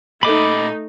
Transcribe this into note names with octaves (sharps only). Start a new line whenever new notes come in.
A#2 A3 D#4 D#5 B5 D6